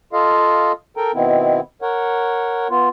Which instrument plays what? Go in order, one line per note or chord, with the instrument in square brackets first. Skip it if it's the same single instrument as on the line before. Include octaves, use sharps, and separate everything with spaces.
[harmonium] F4 A4 D#5 F5
A4 A#4 G5 A#5
B2 D#3 B3 C4 E4
A#4 C#5 F#5
B3 F4